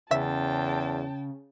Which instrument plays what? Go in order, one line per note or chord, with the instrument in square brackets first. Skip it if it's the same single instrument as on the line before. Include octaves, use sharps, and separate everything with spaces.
[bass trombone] E2 [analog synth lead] C#3 [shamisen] E5 [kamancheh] G5 A5